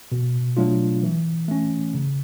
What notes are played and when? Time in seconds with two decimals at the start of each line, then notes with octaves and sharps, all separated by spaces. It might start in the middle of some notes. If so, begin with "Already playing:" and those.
0.12 B2
0.57 F#3 A3 D4 F4
1.03 E3
1.48 A3 C#4
1.94 C#3